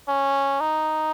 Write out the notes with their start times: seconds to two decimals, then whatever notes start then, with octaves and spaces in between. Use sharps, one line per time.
0.09 C#4
0.61 D#4